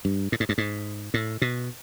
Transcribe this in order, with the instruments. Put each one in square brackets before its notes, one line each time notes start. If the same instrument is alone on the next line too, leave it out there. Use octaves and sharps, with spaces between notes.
[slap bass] G2
A2
G#2
G2
G#2
A2
B2